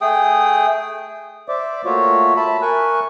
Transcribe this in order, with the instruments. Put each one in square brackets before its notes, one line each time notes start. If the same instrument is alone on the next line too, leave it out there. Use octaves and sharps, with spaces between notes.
[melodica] A3 G#4 G5 D#6
[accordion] C5 D5 E5 D6
A3 A#3 F4 F#4 C#5 E5
E5 A5 B5
A#4 G#5 C#6 F#6